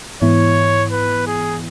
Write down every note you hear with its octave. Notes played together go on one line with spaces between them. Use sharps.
G#2 E3 B3 E4 C#5
B4
G#4